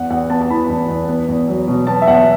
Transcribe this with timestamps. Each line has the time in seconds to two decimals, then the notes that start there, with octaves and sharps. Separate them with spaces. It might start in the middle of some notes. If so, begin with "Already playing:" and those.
Already playing: E2 F#5
0.10 E2 F#5
0.30 B3 A5
0.41 A5
0.50 E3 B5
0.69 E2
0.89 E2
1.09 B3
1.28 E2
1.48 F#3
1.68 B2
1.87 B3 A5
2.02 E5
2.07 E2 F#5